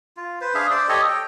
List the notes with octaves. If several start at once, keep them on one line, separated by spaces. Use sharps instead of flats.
F4
B4 C5
D4 G#4 E5 F5
C5 D5
G4 A4 C#5 D#5
G5